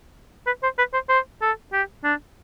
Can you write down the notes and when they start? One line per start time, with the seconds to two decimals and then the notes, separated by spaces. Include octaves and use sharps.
0.46 B4
0.63 C5
0.78 B4
0.93 C5
1.09 C5
1.42 A4
1.73 G4
2.04 D4